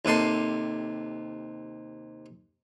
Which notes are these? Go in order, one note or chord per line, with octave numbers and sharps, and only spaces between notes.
D#2 C3 A4 C6